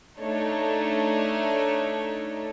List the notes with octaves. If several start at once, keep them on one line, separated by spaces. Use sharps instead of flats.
A3 D4 D#4 A4 C#5